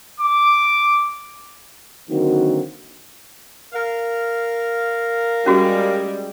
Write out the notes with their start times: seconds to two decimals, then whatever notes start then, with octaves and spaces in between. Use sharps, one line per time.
0.20 D6
2.10 D3 D#3 F#3 A#3 C4 F#4
3.73 A#4 F5
5.46 G3 G#3 C#4 F#4 G#4